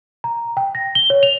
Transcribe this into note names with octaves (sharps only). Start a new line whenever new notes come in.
A#5
G5
A#6
G7
C#5
F7